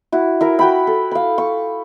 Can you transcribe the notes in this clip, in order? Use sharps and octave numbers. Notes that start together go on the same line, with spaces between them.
E4 F#4
E4 A#4
F#4 G5 B5
A4
F5 B5
C#6